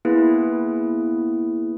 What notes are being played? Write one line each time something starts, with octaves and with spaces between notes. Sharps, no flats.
A#3 B3 E4 G#4 B4